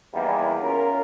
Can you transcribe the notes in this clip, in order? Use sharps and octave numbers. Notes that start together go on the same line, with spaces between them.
E2 D#3 G3 A#3 E4
C#4 F4 A#4